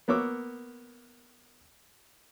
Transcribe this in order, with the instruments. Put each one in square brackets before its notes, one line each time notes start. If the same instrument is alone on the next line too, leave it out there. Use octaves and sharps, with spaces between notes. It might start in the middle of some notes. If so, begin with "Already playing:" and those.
[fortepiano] A#3 B3 C#5 D6 E6